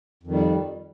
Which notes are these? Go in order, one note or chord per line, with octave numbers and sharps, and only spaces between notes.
F2 D#3 G3